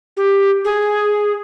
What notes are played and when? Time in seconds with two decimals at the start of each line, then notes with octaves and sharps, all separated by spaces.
0.17 G4
0.65 G#4